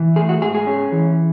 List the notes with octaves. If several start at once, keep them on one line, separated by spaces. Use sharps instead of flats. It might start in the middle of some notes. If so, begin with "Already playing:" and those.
Already playing: E3
A3 G#4
F#4
G#2 G#4
G#4
C#4
E3